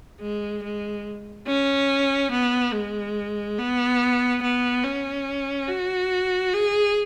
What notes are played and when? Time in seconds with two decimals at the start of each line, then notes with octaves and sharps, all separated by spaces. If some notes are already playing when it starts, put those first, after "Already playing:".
0.21 G#3
0.63 G#3
1.47 C#4
2.31 B3
2.73 G#3
3.58 B3
4.42 B3
4.84 C#4
5.68 F#4
6.53 G#4